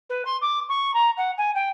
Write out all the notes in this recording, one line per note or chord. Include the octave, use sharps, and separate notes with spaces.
B4
C6
D6
C#6
A#5
F#5
G#5
G5